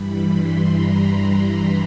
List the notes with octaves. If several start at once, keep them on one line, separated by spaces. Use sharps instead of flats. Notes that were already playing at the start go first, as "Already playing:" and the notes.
Already playing: G2 E3 G3 B5
C6
A#5